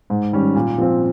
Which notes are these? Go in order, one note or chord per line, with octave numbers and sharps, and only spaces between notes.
G#2
D#3 G3 C#4
A#2
F3 C4